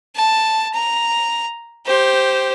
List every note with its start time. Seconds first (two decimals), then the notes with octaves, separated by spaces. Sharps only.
0.16 A5
0.74 A#5
1.86 G4 C5